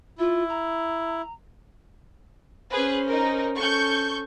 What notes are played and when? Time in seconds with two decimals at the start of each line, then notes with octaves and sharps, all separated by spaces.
0.18 E4 F4
0.49 A#5
2.71 C#4 G#4 B4 C5
3.06 D#4 A#4
3.57 C#4 A4 C#6 G6